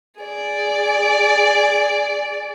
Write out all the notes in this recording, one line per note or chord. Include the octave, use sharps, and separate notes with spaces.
G#4 D5